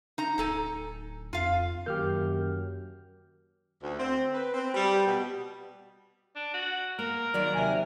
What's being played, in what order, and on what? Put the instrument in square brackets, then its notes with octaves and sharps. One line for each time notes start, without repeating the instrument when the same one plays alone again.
[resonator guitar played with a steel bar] D#4 A#5
[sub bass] D1 [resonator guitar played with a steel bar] D#4 A4 G#5
[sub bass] F2 [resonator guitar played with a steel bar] F4 F5
[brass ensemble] F#2 [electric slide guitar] D#3 A#3 F#4 [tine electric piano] G4 F6 G6 [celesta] A#4
[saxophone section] D2
C4
B4
C4
G3
B2
[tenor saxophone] D4
F#4
[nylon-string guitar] A#3 [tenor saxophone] A#4
[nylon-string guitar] D#2 F#3 D5
[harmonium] C3 G#5